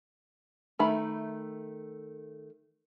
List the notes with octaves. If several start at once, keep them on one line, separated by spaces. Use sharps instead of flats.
D#3 A3 E5 B5